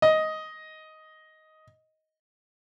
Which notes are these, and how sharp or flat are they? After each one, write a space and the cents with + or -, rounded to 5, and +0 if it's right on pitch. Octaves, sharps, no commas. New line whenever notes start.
D#5 +10